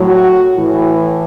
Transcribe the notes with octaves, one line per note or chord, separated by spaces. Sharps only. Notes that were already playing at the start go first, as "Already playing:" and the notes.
Already playing: A2 F#3
F#4
A2 E3